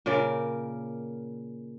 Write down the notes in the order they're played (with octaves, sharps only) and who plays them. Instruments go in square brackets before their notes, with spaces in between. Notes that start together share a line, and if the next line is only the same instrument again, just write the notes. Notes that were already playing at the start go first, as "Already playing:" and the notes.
[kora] A#2 C#3 A#4 D5